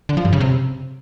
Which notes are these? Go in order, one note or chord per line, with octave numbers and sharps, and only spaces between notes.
D3
F3
G2
C#3
C3